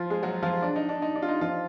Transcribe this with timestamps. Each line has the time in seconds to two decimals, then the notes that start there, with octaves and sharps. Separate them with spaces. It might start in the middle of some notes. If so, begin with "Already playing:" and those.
Already playing: F3 F4
0.10 G#3 G#4
0.23 F#3 F#4
0.43 F3 F4
0.62 D4
0.76 D#4
0.89 D4
1.02 D#4
1.16 D4
1.22 F4
1.28 D#4
1.41 F3 F4